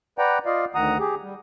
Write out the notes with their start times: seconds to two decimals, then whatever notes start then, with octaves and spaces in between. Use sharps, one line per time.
0.18 B4 D5 F#5 G5 A#5
0.46 F4 D5 D#5 F5
0.75 D2 D#3 F#5 A#5 D#6
1.00 G4 G#4
1.23 G3